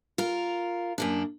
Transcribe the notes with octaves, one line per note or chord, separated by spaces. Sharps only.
F4 A#4
F#2 A#3 D4